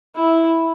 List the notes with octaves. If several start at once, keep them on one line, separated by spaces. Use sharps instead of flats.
E4